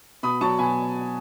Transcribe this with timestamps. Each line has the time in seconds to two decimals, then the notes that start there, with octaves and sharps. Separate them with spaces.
0.23 B2 B5 D#6
0.41 F#3 A5 C#6
0.59 B2 G#5 B5